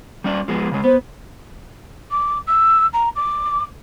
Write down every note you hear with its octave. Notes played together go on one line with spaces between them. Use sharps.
G3 C#4 D5
F3 G#3 B3
C#3 G#3
B3 C5
D6
E6
A#5
D6